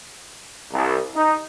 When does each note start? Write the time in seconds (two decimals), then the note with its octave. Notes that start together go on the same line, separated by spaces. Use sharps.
0.72 C2
1.15 D#4